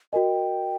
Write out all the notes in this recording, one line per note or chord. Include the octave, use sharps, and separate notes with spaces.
F#4 A#4 D#5 G5 G#5